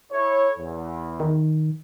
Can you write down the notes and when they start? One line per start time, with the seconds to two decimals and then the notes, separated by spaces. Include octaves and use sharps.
0.12 E4 A4 C#5
0.59 E2
1.20 D#3